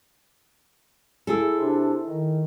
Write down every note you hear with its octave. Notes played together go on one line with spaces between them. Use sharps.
E4 G#4 A4
C3 D4
D#3